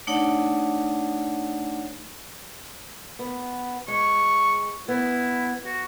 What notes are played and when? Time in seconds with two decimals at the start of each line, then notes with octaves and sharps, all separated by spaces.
0.07 A3 D4 D#4 C#5 D5 F#5
3.19 B3
3.88 G#3 C#6
4.88 B3 E4
5.65 F#4